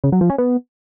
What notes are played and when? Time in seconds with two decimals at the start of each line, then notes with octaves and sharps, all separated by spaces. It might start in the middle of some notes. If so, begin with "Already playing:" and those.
0.04 C#3
0.12 F#3
0.21 F3
0.30 C#4
0.38 B3